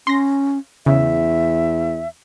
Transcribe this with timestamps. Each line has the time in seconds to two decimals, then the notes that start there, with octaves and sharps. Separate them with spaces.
0.07 C#4 C6 A#6
0.86 E2 C#3 E5